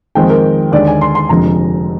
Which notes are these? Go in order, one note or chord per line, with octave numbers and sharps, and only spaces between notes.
F2 D#3 G#3 C4 G5
A#4
D#2 D3 G#3 D5
G#5
C6
C6
F1 F2 D3 G#3 A#5